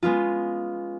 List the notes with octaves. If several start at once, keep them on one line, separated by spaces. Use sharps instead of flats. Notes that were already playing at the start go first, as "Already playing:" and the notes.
G#3 B3 C#4 F4